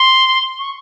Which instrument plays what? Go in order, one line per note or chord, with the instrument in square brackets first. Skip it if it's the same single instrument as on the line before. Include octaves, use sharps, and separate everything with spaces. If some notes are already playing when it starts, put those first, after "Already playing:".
Already playing: [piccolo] C6
C#6